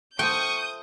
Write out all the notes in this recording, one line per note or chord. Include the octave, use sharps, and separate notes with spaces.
A3 F4 C5 G5 C#6 D#6 G6